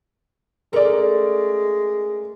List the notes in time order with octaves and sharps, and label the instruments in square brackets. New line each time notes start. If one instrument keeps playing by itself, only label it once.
[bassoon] G#3 [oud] A3 C#4 G#4 [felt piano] A#4 D5